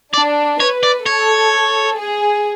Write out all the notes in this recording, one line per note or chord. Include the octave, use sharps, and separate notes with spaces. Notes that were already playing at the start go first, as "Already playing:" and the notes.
D4 D5
B4 C#5
D5
A4 C#5
G#4